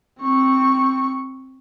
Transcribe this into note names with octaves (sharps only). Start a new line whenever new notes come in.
C4 C#6